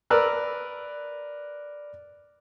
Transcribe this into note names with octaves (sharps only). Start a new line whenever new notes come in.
A#4 B4 D5 E6 F#6